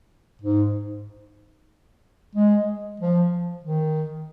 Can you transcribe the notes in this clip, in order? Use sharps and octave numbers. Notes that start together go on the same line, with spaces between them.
G#2
G#3
F3
D#3